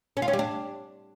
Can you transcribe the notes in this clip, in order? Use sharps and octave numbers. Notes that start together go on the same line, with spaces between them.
C#4
F4
C#4
G3
D4